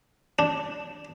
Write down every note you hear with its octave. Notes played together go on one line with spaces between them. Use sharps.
D4